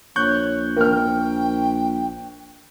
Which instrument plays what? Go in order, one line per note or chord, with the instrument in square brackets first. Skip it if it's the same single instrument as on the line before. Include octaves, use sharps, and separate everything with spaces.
[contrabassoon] A#1 [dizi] C#5 [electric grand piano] C#6 F#6 G6
[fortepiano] A#3 F6 [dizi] G5